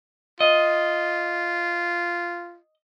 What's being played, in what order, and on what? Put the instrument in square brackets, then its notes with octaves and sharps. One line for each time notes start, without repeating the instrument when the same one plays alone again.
[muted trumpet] F4 [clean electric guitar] D#5